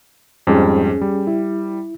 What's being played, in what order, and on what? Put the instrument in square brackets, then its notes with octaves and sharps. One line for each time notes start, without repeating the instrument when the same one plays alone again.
[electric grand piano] F2 G#2 G3 [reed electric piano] C#4 G#4
[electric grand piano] G3
[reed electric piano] E4